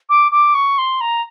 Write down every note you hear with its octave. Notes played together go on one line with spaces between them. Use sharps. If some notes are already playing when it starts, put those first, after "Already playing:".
D6
D6
C#6
C6
A#5